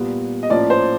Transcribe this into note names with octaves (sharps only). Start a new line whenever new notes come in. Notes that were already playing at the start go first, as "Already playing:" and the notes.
Already playing: A#2 G3 B3
D#5
A2 F3 A#3 C#4 D5
C5